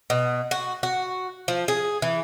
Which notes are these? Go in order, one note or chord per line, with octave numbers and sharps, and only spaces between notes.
B2
F#4
F#4
F3
G#4
E3